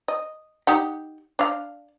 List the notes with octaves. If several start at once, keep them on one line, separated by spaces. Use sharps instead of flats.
D#5
D#4 G4 F#5
D4 F5